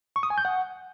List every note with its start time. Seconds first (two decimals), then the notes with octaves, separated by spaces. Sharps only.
0.16 C#6
0.23 D#6
0.30 G#5
0.38 G6
0.45 F#5